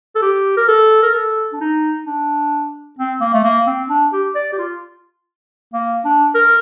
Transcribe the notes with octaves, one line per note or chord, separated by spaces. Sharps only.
A4
G4
A#4
A4
A#4
A4
D4
D#4
D4
C4
A#3
A3
A#3
C4
D4
G4
D5
G4
F4
A#3
D4
A#4